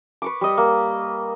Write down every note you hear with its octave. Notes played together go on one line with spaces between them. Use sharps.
B4 C#6 D6
G3 D#5
A#3